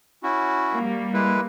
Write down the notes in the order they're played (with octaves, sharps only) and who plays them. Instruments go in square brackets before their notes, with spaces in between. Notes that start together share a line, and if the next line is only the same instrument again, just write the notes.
[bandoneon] C#4 E4 F#4
[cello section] G3 A#3
[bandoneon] G#3 E4 B4